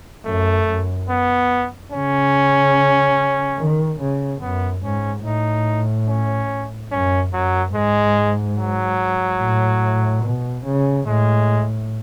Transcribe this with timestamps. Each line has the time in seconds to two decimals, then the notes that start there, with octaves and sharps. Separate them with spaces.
0.25 F#2 A3
0.68 F#2
1.09 B3
1.92 C#3 C#4
3.58 D#3
4.01 C#3
4.41 F#2 B3
4.83 G#2 C#4
5.25 A2 D#4
6.08 C#4
6.91 F#2 C#4
7.33 F#2 F#3
7.74 G#2 G#3
8.58 F#3
9.41 A2
10.24 B2
10.66 C#3
11.07 A2 G#3